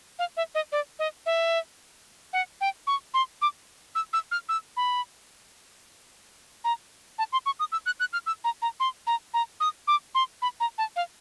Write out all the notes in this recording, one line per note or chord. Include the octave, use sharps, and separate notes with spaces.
F5
E5
D#5
D5
D#5
E5
F#5
G5
C#6
C6
D6
E6
E6
F6
E6
B5
A#5
A5
C6
C#6
D#6
E6
F#6
F#6
F6
E6
A#5
A#5
C6
A#5
A#5
D#6
D6
C6
B5
A#5
A5
F5